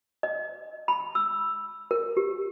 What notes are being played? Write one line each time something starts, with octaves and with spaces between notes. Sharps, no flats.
D#5
B5
E6
A#4
G4